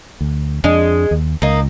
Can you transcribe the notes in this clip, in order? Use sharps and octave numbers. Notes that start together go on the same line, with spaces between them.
D2
F2 G#3 D4
D#2
C#2 A#3 D#4